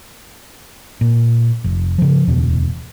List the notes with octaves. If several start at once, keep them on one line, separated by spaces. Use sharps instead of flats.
A#2
F1
C#3 F3
D1 E2 B2